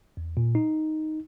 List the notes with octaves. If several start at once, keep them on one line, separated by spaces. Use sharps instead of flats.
E2
A#2
D#4